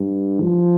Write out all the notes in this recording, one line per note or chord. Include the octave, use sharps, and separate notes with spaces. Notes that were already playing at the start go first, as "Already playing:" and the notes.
Already playing: G2
F3